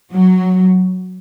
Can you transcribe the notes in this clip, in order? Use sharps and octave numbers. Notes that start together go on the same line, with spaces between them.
F#3